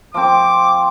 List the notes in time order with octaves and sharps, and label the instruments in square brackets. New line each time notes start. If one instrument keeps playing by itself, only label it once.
[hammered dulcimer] F3 C4 [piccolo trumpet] D6